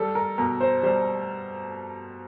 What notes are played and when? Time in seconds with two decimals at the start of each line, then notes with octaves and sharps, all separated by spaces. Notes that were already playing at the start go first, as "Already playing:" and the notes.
Already playing: G3 A4
0.15 A#4
0.38 B2 A#4
0.61 C5
0.83 G3 C5